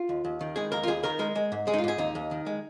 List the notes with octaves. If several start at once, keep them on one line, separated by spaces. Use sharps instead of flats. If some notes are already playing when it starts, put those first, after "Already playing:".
Already playing: F4
D#2
D#2
D#3
G#3 G#4
D#2 A#4
F4
D#2 G#4
D#3 A#4
G#3 A#4
G#3
G#2
G#3 G#4
D#4
F4
G#2 G#4
D#2 D#4
D#2
D#3
G#3